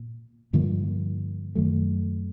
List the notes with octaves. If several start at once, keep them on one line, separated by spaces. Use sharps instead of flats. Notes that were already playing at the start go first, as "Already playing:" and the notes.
Already playing: A#2
G2 D3 F3 A#3
F#2 D#3 F#3 A3